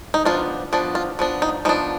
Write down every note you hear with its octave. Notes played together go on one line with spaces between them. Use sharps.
D#4
F3 B3 D4 F4
F3 B3 D4
F4
F3 B3 D4
D#4
F3 B3 D4 D#4